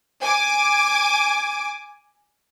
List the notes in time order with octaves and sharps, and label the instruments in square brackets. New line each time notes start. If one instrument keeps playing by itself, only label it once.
[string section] G#5 D6